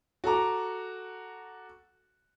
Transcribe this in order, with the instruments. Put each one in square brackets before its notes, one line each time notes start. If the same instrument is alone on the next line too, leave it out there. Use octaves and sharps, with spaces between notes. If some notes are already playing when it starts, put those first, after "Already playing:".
[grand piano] F#4 A4 A#5 D6